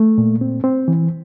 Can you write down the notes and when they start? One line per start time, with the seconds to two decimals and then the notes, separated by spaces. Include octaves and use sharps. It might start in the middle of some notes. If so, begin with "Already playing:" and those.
Already playing: A3
0.18 A#2
0.41 C4
0.64 C4
0.88 E3